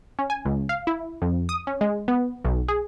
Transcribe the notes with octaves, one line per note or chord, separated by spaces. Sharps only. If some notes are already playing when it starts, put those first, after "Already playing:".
C#4
G#5
C#2
F5
E4
F2
D#6
C#4
G#3
B3
B1
G#4